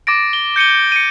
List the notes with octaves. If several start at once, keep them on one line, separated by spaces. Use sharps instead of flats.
D6 A6 A#6 D7
G7
G6 C#7 D#7 G7
C#7 D#7